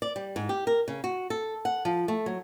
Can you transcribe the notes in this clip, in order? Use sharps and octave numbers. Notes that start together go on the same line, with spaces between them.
D5
G3
G#2
G4
A#4
C#3
F#4
A4
F#5
F3
A3
F#3